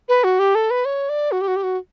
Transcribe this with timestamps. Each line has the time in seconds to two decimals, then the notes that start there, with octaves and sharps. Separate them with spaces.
0.09 B4
0.24 F#4
0.39 G4
0.55 A4
0.70 B4
0.85 C#5
1.09 D5
1.32 F#4
1.41 G4
1.48 F#4
1.56 G4
1.63 F#4